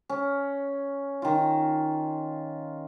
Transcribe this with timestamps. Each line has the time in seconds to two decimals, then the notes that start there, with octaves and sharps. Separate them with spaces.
0.09 C#4
1.22 D#3 F4